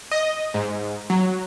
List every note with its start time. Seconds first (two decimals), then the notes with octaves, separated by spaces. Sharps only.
0.11 D#5
0.54 G#2
1.10 F#3